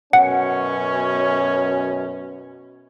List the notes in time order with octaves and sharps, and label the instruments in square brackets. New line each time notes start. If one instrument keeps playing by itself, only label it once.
[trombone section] F#2 B2 C#4 [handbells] F#5